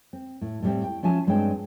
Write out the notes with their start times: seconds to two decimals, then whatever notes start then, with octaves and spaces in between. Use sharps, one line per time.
0.13 C4
0.41 A2
0.63 A2 G3 C4
0.84 G5
1.03 F3 C#4 F4 E5 G#5 A5
1.27 G2 G#3 C4 D4 C#5 G5